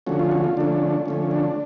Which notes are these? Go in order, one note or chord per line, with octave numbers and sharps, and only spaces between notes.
D3 F3 A3 C#4 F#4
F4
F#4
F4
D3 F3 A3 C#4 D4
D3 F3 A3 C#4
D4